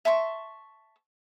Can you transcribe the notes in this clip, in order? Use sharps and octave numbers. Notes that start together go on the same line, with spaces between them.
E5 A5 C6 C#6